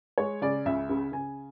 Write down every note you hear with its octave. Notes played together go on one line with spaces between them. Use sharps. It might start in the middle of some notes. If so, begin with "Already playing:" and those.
G#3 C#5
C#3 D5
C#2 E5
C#3
C#3 G#5